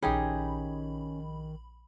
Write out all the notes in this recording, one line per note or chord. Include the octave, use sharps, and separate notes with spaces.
A#1 D#3 C#4 D#4 G4 G#4 B5